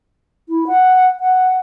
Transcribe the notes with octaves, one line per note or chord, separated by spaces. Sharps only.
E4
F#5
F#5